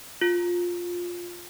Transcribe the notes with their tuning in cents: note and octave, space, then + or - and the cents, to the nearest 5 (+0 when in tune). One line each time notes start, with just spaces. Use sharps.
F4 +10